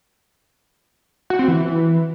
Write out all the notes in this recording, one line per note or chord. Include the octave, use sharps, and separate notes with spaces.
F#4
C4
E3